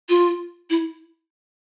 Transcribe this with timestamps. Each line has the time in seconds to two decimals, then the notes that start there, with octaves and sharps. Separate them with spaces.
0.09 F4
0.70 E4